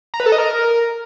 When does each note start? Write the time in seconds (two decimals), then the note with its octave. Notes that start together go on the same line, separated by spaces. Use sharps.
0.14 A#5
0.20 B4
0.26 A4
0.32 D#5
0.38 A#4